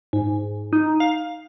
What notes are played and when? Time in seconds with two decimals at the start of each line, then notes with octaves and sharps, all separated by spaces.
0.13 G#2
0.73 D#4
1.00 F5